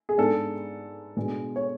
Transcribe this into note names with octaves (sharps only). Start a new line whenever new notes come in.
G#4
G#2 G#3 B3 D4 A4
B2 G#3 D4
C#5